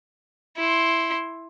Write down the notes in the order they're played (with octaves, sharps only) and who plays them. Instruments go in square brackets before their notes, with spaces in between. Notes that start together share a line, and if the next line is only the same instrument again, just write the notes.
[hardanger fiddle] E4 C6